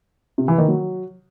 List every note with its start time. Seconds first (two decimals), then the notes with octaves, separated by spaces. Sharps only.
0.38 C3
0.48 E3
0.58 D#3
0.68 F#3